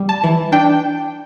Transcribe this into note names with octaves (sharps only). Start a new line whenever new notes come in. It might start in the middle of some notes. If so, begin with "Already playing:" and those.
Already playing: G3
A5
E3
D4 G5